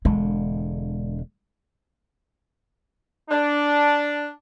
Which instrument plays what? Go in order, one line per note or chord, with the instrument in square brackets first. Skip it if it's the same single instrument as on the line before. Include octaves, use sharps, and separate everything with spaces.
[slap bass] E1 D3 [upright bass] G#3
[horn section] D4